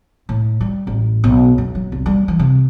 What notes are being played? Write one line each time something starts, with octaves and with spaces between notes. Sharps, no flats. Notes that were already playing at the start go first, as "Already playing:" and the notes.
A2
G3
A1
B1
F#2
F#3
C2
G3
E3
C3